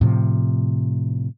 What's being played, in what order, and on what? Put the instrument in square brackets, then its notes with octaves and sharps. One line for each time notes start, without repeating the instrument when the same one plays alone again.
[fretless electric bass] A2 C3 F3